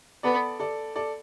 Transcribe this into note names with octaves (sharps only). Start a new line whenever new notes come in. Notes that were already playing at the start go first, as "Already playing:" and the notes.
B3 A4 D5
A4 D5
A4 D5